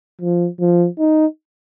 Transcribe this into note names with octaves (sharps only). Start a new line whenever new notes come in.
F3
F3
D#4